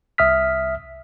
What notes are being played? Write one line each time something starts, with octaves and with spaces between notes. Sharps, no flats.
C2 E5 D#6 F6 B6